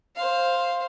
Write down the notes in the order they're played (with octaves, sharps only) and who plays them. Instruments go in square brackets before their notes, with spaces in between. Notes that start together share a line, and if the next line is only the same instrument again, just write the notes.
[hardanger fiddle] C5 F5